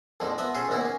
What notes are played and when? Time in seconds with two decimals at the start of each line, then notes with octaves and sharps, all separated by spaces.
0.20 A#1 F2 D3 F3 D#4
0.38 F3 B3 D#5 E5 B5
0.55 C#4 F4 G#4 A4 C5
0.68 A#1 D#2 A#2 B3 D#4 E4
0.81 A#3 C#4